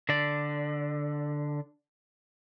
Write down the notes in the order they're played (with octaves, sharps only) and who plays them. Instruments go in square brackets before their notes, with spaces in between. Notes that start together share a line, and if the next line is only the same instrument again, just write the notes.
[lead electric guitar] D3 D5